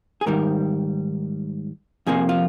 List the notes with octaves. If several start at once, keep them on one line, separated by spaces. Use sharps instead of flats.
G#4
G#2 D#3 G3 A#4
F2 C3 F3 A#3 G#4
F4